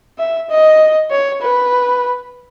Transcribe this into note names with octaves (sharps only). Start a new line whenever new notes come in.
E5
D#5
C#5
B4